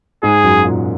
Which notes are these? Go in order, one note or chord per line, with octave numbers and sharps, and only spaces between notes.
G#2 G#3 G#4
F#2 F#3
A#2